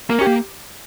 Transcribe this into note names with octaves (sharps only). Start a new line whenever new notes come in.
A#3 A#4
C#4 G4
A#3